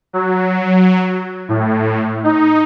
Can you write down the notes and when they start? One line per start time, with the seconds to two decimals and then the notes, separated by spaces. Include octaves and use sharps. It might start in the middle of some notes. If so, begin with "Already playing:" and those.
0.13 F#3
1.49 A2
2.24 D#4